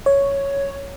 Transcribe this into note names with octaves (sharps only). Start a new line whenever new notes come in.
C#5